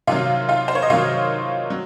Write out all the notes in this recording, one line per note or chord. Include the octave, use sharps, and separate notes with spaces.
C3 D#3 F#3 F4 F5
F4 F5
C5
C#5
D#5
C3 D#3 F#3 F4 F5
F#3